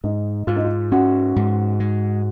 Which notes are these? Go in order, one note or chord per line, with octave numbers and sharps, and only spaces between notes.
G#2 D#4
G#2 F4
D#4
F4
C#4 F#4
G#2
G#3